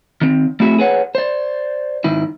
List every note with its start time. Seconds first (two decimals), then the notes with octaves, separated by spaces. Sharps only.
0.21 D#3 C4
0.60 A3 C4 E4 F#4 G#4 E5
0.78 G#4 B4 C#5 F#5
1.15 C5 D5
2.04 G#2 D#3 E4